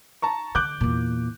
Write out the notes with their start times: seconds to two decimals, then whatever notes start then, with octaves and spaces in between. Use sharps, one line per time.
0.22 A5 A#5 C#6
0.55 D3 D6 F#6 G6
0.81 E2 A#2